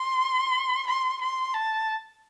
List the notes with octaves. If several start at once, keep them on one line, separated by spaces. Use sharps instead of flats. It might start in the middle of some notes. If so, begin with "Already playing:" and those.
Already playing: C6
C6
C6
A5